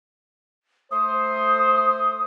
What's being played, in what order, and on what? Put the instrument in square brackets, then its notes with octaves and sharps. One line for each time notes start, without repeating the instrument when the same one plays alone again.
[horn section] A3 C5 [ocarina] D#6